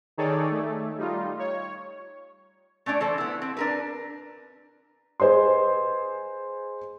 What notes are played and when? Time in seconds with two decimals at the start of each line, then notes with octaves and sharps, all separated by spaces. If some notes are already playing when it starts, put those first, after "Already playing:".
0.18 D#3 D#4 G#4 A4 C#5 D5
0.51 A3
0.98 G3 D#4 F4
1.39 C#5
2.86 A3 C#4 D4 D5
3.01 E3 A4 C5
3.18 B3 E4
3.42 C4
3.57 D4 A#4 B4
5.20 G#4 B4 C5 D#5 C6